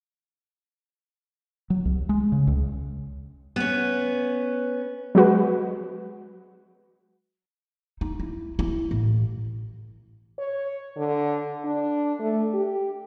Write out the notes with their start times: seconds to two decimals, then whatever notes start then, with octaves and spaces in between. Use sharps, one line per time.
1.70 F#3
1.85 C2
2.09 G#3
2.32 C#3
2.47 C#2
3.56 B3 C#4
5.15 F#3 G#3 F#4 B4
8.01 D#4
8.20 E4
8.59 E4
8.91 A1
10.39 C#5
10.97 D3
11.65 D4
12.20 A3
12.54 G4